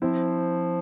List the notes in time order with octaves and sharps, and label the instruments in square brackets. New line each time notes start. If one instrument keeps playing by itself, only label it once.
[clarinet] F3 [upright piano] C4 E4